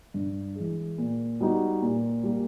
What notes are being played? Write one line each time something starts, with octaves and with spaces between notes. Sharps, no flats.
G2
E3 G#3
A#2
G3 B3 D#4 F#4
A#2
G3 A#3